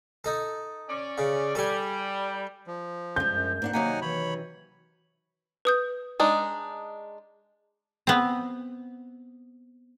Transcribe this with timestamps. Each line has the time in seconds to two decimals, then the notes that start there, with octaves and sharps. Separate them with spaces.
0.24 D#4 A4
0.89 C#4 D5
1.18 C#3
1.55 G3 A4 G#5
2.67 F3
3.16 G2 G#3 G6
3.30 F#2
3.62 G#2 A#3 D4 F#5
3.73 C3 D#3 F#3 A#3 D#4 F#5 G#5
4.02 E3 C#5 B5
5.65 B4 D#6 G6
6.20 G#3 D4 D#4
8.07 B3 C4